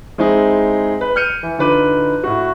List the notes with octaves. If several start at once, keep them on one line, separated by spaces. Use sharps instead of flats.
G#3 C4 D#4 E4 G#4
B4
F6 G6 C#7 D#7
E3
D3 D#4 F4 B4 D6 D#7
A2 F#4